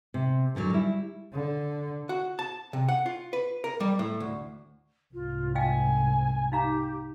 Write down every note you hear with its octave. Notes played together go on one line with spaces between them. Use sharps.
C3
F#2 D3 D#3 F#3
G3 E4
D3
F#4
A5
C3
F#5
F4
B4
A#4
G3
A2
D2
C2 G#2 F4
D#5 F5 G5 G#5
D#4 G4 F5 A#5